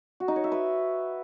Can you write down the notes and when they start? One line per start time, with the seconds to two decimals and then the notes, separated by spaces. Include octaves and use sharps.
0.20 F#4
0.28 D#4
0.36 C#5
0.44 E5
0.52 B4